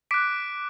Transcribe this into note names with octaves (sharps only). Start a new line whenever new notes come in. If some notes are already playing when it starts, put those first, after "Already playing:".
D6 F#6 B6 D7